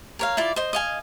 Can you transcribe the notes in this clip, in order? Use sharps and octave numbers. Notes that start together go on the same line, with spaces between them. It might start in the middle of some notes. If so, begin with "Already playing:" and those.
A#4 C#5 F5
E4 F4 D5
C5 D#5
D#5 F5 G#5